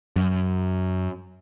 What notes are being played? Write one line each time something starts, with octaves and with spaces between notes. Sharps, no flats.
F#2